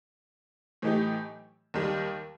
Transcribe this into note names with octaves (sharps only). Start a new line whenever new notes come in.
A2 E3 A3 D#4 G4
D#2 D#3 G3